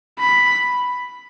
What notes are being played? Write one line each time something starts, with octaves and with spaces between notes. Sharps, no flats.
B5